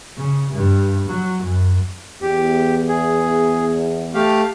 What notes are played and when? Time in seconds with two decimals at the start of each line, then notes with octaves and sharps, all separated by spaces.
0.17 C#3
0.53 G2
1.07 F#3
1.42 F#2
2.22 E2 G4
2.89 G#4
4.15 A3 G4 F5